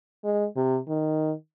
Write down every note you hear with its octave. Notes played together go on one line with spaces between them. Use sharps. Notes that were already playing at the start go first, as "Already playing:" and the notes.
G#3
C3
D#3